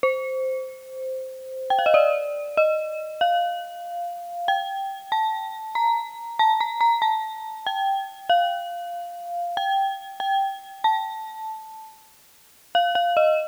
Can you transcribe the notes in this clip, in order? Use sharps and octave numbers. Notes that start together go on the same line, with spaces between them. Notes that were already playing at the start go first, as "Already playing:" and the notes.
C5
G5
F5
D#5
D5
D#5
F5
G5
A5
A#5
A5
A#5
A#5
A5
G5
F5
G5
G5
A5
F5
F5
D#5